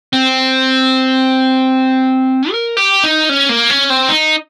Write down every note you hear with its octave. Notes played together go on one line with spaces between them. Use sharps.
C4
A#4
G4
D#4
C#4
A#3
C#4
C4
D#4